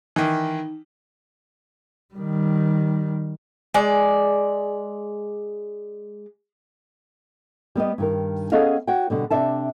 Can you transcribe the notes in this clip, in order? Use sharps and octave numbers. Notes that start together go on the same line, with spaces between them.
D#3 E3 D#4
D#3 G3
G#3 D5
G3 B3 G4 D#5
G2 D#3 A#4
B3 C#4 G#4 A4 D#5 F5
F#4 C#5 F#5 G5
B2 D3 G3
C3 D4 D5 E5 A5